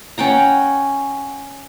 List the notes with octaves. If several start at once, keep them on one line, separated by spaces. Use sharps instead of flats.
C#4 F#5 G5 A#5